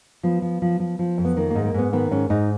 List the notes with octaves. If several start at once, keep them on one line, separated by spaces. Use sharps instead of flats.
F3 B3
F3
F3
F3
F3
F2
B3
D#3 A#3
G#2 A#3
A#3
G#2 B3
D#3 B3
G#2 C#4
G#2 D#4